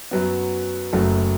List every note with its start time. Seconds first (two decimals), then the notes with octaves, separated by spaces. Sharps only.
0.11 F#2 F#3 B3
0.93 F#1 F#2 F#3 A3